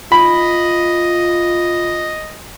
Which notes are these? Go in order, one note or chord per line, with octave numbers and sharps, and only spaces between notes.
F4 D#5 B5